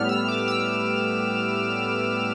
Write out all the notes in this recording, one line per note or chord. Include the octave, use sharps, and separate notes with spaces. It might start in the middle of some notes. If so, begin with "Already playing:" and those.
Already playing: A2 G3 B3 F6
E6
D6
E6